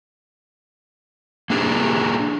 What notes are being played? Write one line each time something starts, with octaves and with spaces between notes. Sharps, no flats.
A#3 D4 G4 G#4